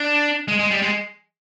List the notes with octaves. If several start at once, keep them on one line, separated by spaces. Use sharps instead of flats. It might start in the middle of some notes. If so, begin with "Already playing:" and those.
Already playing: D4
G#3
G#3
G3
G#3